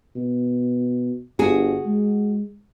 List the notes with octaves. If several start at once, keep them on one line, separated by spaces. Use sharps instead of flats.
B2
G1 F#4 G#4
G#3